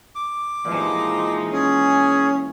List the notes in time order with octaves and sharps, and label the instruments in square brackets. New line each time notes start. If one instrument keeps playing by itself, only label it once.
[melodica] D6
[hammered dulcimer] A#2 E3 G#3 [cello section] F3 D#4
[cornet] C#4 [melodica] G#4